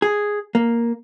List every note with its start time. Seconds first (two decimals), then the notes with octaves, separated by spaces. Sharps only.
0.02 G#4
0.55 A#3